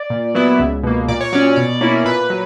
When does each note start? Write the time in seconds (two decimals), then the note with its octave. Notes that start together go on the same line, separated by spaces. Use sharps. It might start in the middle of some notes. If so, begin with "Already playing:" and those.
Already playing: D5
0.10 A#2
0.35 F#3 B3 E4
0.59 C#2
0.83 B2 A#3
1.08 A#2 D5
1.21 C#5
1.32 F#3 C#4 D5
1.56 B2 D5
1.81 A#3 C#4 E4
2.05 A#2 B4
2.30 F#3